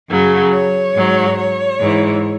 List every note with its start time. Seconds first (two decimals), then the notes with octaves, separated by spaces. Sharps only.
0.10 F#2 C#3 F#3
0.53 C#5
0.95 G#2 F#3
1.38 C#5
1.80 G#2 E3